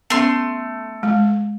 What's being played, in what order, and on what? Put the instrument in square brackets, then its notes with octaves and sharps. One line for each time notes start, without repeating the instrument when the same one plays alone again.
[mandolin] A3 C6 [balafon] B3 C#4
[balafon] G#3